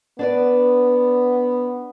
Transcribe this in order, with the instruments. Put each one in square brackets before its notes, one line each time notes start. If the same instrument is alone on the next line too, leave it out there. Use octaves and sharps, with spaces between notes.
[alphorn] B3 [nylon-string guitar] D4 B4 D5